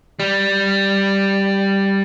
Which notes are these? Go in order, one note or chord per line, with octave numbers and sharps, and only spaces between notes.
G3